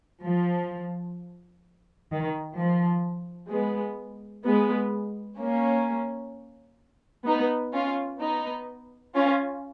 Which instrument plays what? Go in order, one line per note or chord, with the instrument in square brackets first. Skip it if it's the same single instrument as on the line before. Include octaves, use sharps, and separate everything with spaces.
[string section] F3
D#3
F3
G#3 B3
G#3 B3
A#3 C#4
B3 D#4
C#4 F4
B3 D#4
C#4 F4